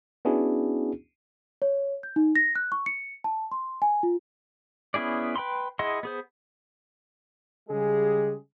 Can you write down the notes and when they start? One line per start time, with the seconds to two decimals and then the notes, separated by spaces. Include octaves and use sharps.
0.25 B3 C#4 D4 E4 F#4 G#4
1.62 C#5
2.03 G6
2.16 D#4
2.36 A#6
2.55 F#6
2.72 C#6
2.86 C#7
3.24 A5
3.52 C6
3.82 G#5
4.03 F4
4.94 B3 C#4 E4 G#4 D5
5.36 B4 G5 B5 C6
5.79 E4 G#4 D#5 F#5 C6
6.03 B3 G#4 C5
7.69 C#3 G3 G#3 G4 G#4